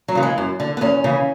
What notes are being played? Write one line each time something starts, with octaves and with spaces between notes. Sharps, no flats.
F#3
C#3 E3
G#3
F#2
D3
B3
E2 C#4
C#3 E3